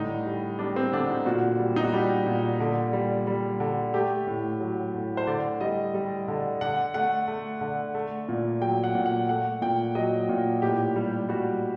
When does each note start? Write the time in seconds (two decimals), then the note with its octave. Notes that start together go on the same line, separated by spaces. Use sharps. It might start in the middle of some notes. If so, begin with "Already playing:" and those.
Already playing: A2 D3 G3 D#4
0.26 G3
0.59 G3 D4
0.76 C4
0.93 D3 D4
1.10 D#4
1.26 A#2 F#4
1.59 G3
1.76 D#4
1.84 F#4
1.93 G3 G4
2.27 A#2
2.60 D3
2.93 G3
3.27 G3
3.60 D3
3.94 A3 G4
4.27 A2
4.60 F#3
4.94 A2
5.17 C5
5.27 D3 D5
5.61 G3 D#5
5.94 G3
6.28 D3
6.61 D3 F#5
6.94 A3 F#5
7.28 A3
7.61 D3
7.94 A3
8.29 A#2
8.62 F#3 G5
8.84 F#5
8.95 A#2
9.06 F#5
9.29 A3 F#5
9.62 A#2 G5
9.95 F#3 D#5
10.29 A#2
10.62 A2 G4
10.96 G3
11.29 G3 F#4